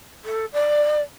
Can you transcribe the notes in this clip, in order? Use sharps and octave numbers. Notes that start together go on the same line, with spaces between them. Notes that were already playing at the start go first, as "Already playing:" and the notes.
A4
D5